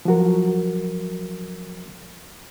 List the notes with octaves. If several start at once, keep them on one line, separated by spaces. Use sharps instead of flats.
F3 F#3 F#4 A#4